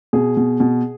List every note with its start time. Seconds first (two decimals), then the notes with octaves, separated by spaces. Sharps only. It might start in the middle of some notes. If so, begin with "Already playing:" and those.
0.13 B2 G#4
0.37 B2
0.60 B2